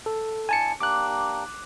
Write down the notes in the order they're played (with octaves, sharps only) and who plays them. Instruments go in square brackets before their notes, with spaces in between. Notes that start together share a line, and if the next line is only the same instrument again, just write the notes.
[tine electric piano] A4
[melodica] D4 E4 [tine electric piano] G#5 A5 C#7
[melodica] A#3 D4 G4 [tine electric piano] D6 F#6